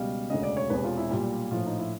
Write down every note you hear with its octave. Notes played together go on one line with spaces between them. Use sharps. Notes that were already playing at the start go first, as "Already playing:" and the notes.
Already playing: C#2 B2 G3 F5
E1 D2 C#3 D#5
D5
C#5
E1 E2 C3 B4
F4
E4
B1 A#2 G3 F4
A#1 A2 F3 F4
D#4
E4